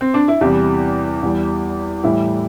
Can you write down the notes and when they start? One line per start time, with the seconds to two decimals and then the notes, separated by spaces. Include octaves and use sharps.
0.01 C4
0.14 D4
0.28 E4
0.41 E2 C3 E3 G3 G4
1.22 E2 E3 G3
2.04 A2 E3 G3 E4